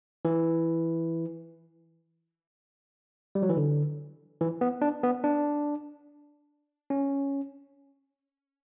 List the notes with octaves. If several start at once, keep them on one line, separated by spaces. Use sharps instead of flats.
E3
G3
F#3
E3
D3
E3
B3
D4
B3
D4
C#4